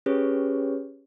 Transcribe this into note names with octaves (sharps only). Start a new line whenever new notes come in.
C#4 G4 G#4 B4 C#5